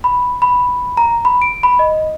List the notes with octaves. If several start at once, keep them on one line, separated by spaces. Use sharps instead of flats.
B5
B5
A#5
B5
D7
B5
D#5